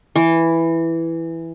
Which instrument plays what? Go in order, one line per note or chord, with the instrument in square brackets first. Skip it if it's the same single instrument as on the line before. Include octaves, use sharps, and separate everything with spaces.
[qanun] E3